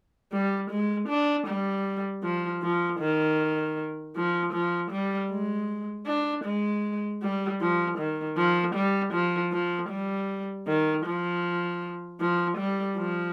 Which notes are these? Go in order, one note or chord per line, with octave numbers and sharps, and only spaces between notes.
G3
G#3
D4
G3
F3
F3
D#3
F3
F3
G3
G#3
D4
G#3
G3
F3
D#3
F3
G3
F3
F3
G3
D#3
F3
F3
G3
F3